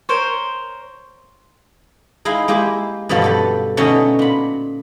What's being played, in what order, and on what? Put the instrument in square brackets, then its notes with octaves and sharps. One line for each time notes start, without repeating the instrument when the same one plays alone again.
[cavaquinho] A#4 C5 C#5
[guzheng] G#3 D#4 E4 F5
G#3 A#3 E4 G4
G2 B2 D3 F3 F#3
G4 A4 B4
B2 D3 A3 C#4 D#4 F#4
A#2 B5